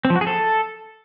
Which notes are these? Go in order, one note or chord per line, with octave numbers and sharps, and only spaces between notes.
C4
F3
F#4
G#4
A4